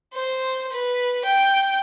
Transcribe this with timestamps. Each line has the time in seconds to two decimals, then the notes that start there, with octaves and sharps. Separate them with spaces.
0.14 C5
0.72 B4
1.26 G5